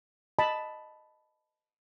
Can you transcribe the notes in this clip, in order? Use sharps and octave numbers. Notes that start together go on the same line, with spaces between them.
D#5 A5 B5